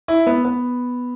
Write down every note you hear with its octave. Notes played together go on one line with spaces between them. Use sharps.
E4
B3
B3